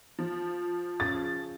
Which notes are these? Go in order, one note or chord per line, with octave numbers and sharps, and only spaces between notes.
F3
C#3 A6